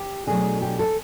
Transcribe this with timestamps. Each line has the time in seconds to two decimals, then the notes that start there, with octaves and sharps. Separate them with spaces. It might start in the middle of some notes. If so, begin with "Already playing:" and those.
Already playing: G4
0.27 B2 F#3 A3 D4 G#4
0.62 G4
0.79 A4